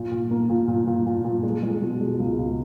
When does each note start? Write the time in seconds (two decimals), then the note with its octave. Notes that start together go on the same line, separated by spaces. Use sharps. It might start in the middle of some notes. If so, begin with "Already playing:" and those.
Already playing: A#2
0.11 A#2
0.31 A#3
0.49 A#2
0.68 A#2
0.87 A#2
1.06 A#2
1.24 A#2
1.43 G#3
1.63 G#3
1.82 B2
2.01 G#3
2.20 C#2
2.38 C#2